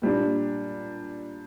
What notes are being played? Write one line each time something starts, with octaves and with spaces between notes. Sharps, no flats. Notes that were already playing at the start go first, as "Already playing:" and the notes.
A#2 G3 D4